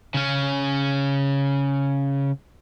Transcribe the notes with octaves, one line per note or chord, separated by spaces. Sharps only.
C#3 C#4